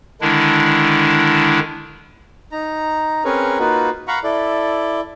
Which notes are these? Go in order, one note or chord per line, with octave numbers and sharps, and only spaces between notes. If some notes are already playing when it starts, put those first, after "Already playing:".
D3 D#3 G#3 D4 E4
D#4 A#5
C4 C#4 G#4 A#4 B4 C#5
A#3 D#4 F4 F#4 B4
F5 F#5 A#5 B5 C#6
E4 A4 D5